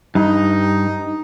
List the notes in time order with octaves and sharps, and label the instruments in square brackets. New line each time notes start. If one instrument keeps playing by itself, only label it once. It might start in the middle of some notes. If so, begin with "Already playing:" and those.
[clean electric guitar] G2 [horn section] D#4